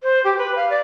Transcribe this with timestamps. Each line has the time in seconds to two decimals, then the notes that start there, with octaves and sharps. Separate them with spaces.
0.03 C5
0.24 G4
0.38 B4
0.56 F5
0.70 D5